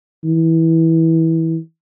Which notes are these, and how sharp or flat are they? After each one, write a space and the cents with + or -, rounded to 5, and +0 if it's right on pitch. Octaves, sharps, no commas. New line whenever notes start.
E3 -20